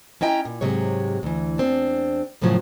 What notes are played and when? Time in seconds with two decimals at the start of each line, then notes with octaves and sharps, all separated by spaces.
0.21 C#4 E4 D#5 G5 A#5
0.45 A#2
0.61 G#2 C3 F#3 G#3 C#5
1.23 D2 E3
1.58 E2 C4 D4
2.42 F#2 A2 C#3 F3 F#3